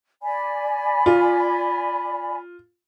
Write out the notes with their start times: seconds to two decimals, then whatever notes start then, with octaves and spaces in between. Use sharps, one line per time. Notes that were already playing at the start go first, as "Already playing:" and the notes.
0.22 D5 G#5 B5
1.06 F4